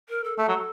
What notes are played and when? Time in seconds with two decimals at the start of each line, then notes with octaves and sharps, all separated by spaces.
0.09 A#4
0.24 A4
0.38 A3 A4
0.48 F#3